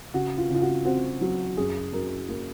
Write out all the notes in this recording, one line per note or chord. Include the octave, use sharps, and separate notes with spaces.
C#3 F#4
F4
C#3
F4
F#4
C4 F#4
F#3
F#2 G#4
F#2 A#4
A#3